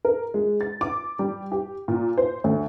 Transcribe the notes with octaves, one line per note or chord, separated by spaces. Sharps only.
A#4
G#3
A6
D6
G3
G4
A#2
C5
D2